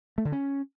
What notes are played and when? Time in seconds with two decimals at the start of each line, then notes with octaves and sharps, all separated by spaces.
0.18 A3
0.25 D3
0.32 C#4